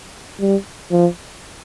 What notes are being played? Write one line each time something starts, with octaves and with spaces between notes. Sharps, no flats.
G3
F3